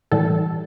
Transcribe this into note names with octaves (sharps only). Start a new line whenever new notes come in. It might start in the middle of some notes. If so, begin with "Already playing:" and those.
A2 E3 G3 A4